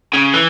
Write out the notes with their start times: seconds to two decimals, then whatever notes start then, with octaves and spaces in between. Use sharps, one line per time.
0.13 C#3
0.34 E3